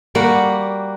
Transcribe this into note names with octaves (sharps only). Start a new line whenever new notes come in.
G3 A#3 F#4 F#5